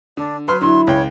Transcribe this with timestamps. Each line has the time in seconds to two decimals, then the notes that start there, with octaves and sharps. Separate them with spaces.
0.17 D3 D4
0.48 F#3 B4 C6 F6
0.61 D3 F#3 E4 C6
0.87 C#2 C#5 G5